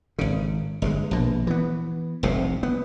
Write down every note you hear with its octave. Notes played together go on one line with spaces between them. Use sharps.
G#1 C#3
G1 D3 G#3
A#1 B2
E3 B3
F1 C2 A2 C3
B3